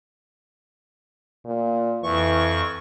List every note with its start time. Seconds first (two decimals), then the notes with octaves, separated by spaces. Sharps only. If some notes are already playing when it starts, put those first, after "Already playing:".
1.45 A#2
2.03 F2 E3 C#6